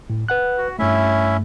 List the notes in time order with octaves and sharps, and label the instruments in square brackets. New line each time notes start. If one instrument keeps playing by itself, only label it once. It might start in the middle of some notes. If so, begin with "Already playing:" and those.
[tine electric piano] A2
B4 F#5 F#6
[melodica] F#4
[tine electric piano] G2 A3 [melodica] C#4 E4 E5